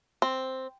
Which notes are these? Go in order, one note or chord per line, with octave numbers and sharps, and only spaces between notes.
C4